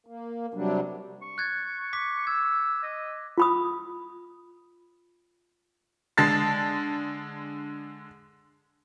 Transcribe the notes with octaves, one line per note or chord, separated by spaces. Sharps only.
A#3
C3 F#3 G3 D4
C#6
F#6 G#6 A6
D6 B6
E6 G#6
D#5
F4 B5 D#6
D3 G#3 A5 A6 C7